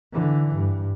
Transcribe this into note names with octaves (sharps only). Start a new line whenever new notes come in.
D3 E3
G2